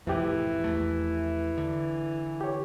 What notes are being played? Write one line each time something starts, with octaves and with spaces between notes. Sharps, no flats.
F2 A2 C3 E3 F3 G4
E2 A3
D3
G4 C#5